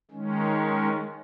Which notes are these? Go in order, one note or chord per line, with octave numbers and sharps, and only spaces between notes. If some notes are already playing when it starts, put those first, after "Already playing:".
D#3 G#3 C#4